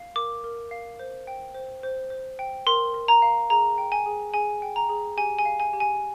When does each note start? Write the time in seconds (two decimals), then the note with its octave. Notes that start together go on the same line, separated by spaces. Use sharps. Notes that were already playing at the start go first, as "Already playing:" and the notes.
Already playing: F5
0.16 A#4 D6
0.44 A#4
0.71 F5
0.99 C5
1.27 G5
1.54 C5
1.83 C5
2.10 C5
2.39 G5
2.67 A#4 C6
2.94 A#4
3.08 A#5
3.22 F5
3.50 G#4 A#5
3.78 G5
3.92 G#5
4.06 G#4
4.34 G#4 G#5
4.62 G5
4.76 A#5
4.89 G#4
5.17 G4 G#5
5.39 G#5
5.45 F5
5.60 G#5
5.73 G4
5.80 G#5